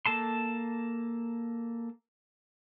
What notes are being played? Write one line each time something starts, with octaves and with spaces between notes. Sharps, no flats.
A#3 A4 A5 C6